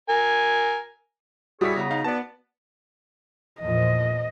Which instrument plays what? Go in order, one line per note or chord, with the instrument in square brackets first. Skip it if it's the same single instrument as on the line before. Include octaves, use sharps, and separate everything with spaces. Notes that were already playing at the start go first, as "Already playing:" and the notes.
[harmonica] A#4 G#5
[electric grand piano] G3 E4 B6 [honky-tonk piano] F#4 D#6 [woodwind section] G#4 A4 C#5
[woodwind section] C#3 B3 A#5
[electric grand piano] D#4 F5
[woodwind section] B3 [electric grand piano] D5 A5
[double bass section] E2 A#2 F3 [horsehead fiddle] D#5